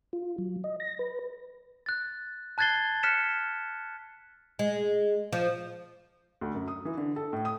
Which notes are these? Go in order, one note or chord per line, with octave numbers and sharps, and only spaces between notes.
F4
F#3
D#5
A#6
B4
F#6 A6
A5 F#6 G#6 A6 C7 G7
F6 F#6 B6 C#7 E7
G#3
F3
D2
F#2
D#6
E3
D3
A4
A2
D#6